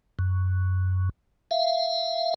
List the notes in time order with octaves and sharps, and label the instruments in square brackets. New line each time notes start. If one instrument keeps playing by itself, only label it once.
[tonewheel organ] F#2
E5 F5